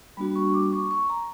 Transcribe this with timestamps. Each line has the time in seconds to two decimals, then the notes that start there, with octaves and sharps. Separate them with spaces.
0.17 G3 A#3 D4 F#4 B5
0.36 C#6
0.54 D6
0.72 C#6
0.91 C#6
1.10 A#5